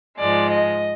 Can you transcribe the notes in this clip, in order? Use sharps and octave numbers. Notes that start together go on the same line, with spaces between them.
G#2 F3 G#3 D5
D#5